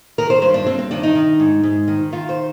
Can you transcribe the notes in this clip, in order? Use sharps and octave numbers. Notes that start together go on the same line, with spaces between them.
D#3 A#4
C5
G2 C5
D4
G2 C4
C4
D#3 D4
D#4
D#3
G#2
G#2
D#3
D#3 F4
C5